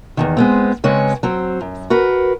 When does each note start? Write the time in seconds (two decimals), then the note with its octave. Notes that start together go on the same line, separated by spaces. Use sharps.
0.17 E2 G2 D#3
0.37 G#3 B3 C4
0.84 C#3 G#3 C4 B4 C#5
1.23 F#3 C4
1.61 F#2
1.90 F#4 A#4 B4